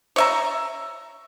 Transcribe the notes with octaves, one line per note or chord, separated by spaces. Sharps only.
C#5 E5 A#5